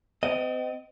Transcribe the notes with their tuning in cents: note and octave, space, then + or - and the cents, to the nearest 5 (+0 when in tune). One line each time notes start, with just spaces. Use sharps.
C4 -40 D#5 +0